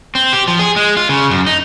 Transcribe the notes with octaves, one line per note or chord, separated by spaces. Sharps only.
C4
G4
F3
G#4
G#3
F4
C#3
F#2
D#4